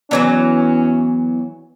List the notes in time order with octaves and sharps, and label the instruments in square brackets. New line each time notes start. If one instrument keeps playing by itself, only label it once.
[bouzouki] D3 E3 F#3 [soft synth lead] B3 [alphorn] C#4